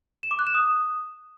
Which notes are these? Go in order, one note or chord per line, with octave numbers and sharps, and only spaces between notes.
E7
D6
F#6
E7
D#6